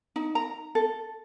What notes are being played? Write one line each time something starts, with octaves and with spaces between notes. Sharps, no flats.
D#4
A#5
A4